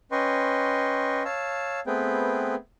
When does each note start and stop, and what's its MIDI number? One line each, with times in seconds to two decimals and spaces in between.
0.12 1.23 61
0.12 1.23 71
0.12 1.23 75
0.12 1.23 79
0.12 1.23 84
0.12 1.23 85
1.25 1.80 73
1.25 1.80 77
1.25 1.80 81
1.25 1.80 88
1.87 2.55 57
1.87 2.55 59
1.87 2.55 60
1.87 2.55 68
1.87 2.55 71
1.87 2.55 79